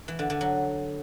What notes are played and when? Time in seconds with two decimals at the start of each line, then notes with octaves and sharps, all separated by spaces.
0.08 E3
0.19 D3
0.30 D3
0.41 F#3